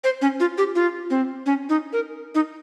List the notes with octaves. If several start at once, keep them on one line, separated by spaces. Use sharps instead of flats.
C5
C#4
F4
G4
F4
C4
C#4
D#4
A#4
D#4